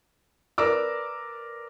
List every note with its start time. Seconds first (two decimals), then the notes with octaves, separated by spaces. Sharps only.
0.58 A#4 B4 D5 D6 E6